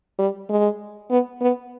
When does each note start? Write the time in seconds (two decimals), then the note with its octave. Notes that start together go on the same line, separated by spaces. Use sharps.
0.19 G3
0.49 G#3
1.10 B3
1.41 B3